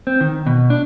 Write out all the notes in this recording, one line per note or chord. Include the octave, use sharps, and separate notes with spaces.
C4
D#3
B2
D4